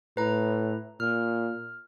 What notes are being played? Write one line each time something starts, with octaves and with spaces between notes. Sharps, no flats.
A2 B4 A#5
A#2 F6